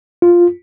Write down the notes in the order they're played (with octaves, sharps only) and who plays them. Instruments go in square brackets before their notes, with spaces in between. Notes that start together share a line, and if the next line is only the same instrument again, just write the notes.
[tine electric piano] F4